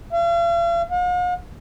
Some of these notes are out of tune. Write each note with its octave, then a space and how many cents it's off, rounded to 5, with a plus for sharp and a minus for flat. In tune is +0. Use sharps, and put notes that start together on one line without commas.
F5 -45
F5 +45